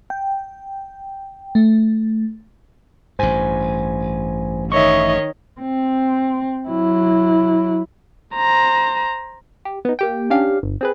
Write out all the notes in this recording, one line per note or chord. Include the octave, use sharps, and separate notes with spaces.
G5
A3
A1 G2 C5 G#5
D#3 C#5 D#5 E5 C#6
C4
F#3 E4
C5 A#5
G4
B3 D#4
A#3 G4 G5
C#4 D4 G4 F5
G1
C4 G#4 B4